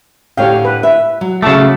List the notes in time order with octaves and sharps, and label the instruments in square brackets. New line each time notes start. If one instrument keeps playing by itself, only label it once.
[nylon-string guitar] A2 D3 G5 [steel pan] G4 C#5 F5
[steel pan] B4
[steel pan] B4 [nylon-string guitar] E5
[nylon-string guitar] F#3
[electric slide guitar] C#3 A3 [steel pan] F#4 A5 D6